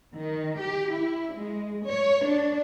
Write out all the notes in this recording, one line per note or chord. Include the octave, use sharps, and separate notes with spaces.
D#3
G4
E4
G#3
C#5
D4